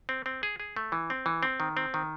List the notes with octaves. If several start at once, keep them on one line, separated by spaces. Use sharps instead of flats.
C4
C4
G#4
G#4
A3
E3
C4
E3
C4
D#3
C4
D#3